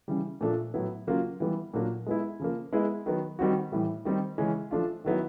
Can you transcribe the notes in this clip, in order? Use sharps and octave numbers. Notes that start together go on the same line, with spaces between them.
C#3 E3 G3
A#2 F3 A3 D4 F4
A2 F#3 B3 E4
C#3 F#3 A#3 C#4 F4
E3 G3 B3
A#2 F#3 A#3 D4
G#3 B3 E4
C#3 F3 A#3
G#3 B3 E4 G#4
D#3 F#3 B3
D#3 G3 C4 D#4 F#4
A2 E3 G3
D#3 G3 C4 D#4
C#3 E3 G#3 C#4
F3 A3 D4 F4
D#3 F#3 B3 E4